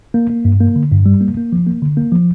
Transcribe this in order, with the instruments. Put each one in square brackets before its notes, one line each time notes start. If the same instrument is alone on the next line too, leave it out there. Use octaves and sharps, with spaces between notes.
[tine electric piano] A#3
A#3
G2
A#3
D3
G2
G3
A#3
A#3
F3
A#3
D3
A#3
F3